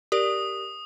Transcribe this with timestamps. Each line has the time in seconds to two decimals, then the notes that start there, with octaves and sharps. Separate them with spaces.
0.12 G4 A#4 D5 D#6